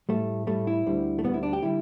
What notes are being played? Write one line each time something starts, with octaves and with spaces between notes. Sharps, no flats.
A2 G3 A3
A2 G3 A3
E4
D2 D3 G3
A3
D2 D3 G3 B3
E4
D4
G4
D3 G3 E4